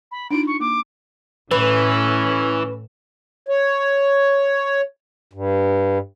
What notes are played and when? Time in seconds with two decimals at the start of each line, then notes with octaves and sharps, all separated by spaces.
0.12 B5
0.31 D4 D#4 F4 D7
0.47 C#6
0.60 A#3 D6
1.51 A2 E3 C#4 B4
3.49 C#5
5.33 G2